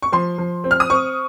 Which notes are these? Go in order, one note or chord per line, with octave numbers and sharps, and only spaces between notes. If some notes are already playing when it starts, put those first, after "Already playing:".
C#6
F3 C6
F3
C4
F6
D#6
C4 C#6